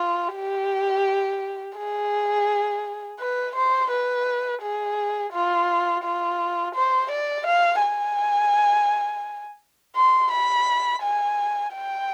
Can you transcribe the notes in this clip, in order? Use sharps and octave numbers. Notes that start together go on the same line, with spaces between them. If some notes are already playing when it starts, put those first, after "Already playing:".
Already playing: F4
G4
G#4
B4
C5
B4
G#4
F4
F4
C5
D5
F5
G#5
C6
B5
G#5
G5